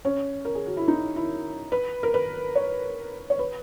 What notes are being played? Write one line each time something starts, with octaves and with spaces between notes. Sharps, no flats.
C#4
A#4
G#4
F#4
E4
D#4
E4
B4
A#4
B4
C#5
C#5
B4